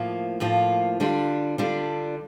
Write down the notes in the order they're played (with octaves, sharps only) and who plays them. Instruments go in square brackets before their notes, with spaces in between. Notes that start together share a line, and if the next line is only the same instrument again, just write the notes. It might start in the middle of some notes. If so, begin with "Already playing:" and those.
Already playing: [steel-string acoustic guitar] A2 F3 A#3 F4
A2 F3 A#3 F4
D3 G3 D4 F4
D3 G3 D4 F4